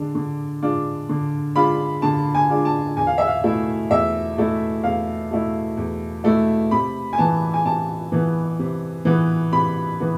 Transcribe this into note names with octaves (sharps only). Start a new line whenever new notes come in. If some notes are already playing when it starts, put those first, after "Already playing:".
Already playing: D3 G#3 D4
D3
G#3 D4 F4
D3
G#3 D4 F4 B5
D3 A5
G#5
G#3 D4 F4
A5
E2 G#5
F5
E5
F5
B2 A3 E4
E2 E5
B2 A3 E4
E2 F5
B2 A3 E4
E2
B2 A3 E4
C3 B5
G#5
E3 B3 A5
G#5
C3 A5
E3 B3
C3
E3 B3
C3 B5
E3 B3